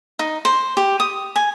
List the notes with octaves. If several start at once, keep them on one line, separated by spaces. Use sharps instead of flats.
D#4
C5
G4
D#6
G#5